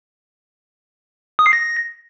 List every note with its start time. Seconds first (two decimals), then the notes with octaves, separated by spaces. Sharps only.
1.39 D#6
1.46 C7
1.53 A#6